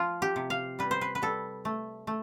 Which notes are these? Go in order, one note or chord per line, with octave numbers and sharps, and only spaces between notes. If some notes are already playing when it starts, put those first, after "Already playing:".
Already playing: F3 F4
G4
C3
F5
G3 B4
C5
B4
B4
G3 A4
A3
A3